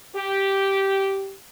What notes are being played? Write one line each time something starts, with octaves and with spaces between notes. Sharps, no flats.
G4